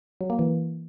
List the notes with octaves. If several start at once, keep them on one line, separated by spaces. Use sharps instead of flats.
F#3
A#3
E3